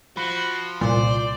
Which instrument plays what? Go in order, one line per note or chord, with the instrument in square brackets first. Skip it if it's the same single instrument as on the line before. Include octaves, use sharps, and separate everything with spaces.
[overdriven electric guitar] F3 [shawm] F#4 [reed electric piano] B5
[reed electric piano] C2 [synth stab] A#2 [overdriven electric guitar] C5 [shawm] D5